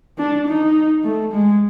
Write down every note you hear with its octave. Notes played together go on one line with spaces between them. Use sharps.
D4
D#4
A3
G#3